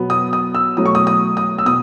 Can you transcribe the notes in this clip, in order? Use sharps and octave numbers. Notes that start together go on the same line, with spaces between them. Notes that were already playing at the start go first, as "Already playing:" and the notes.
Already playing: B2 F#3 B3
D#6
D#6
E6
B2 F#3 A3 D#6
C#6
D#6
D#6
D#6
E6
B2 D#6